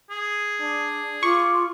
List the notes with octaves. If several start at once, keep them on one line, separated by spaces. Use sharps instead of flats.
G#4
D4
F4 C#6 D6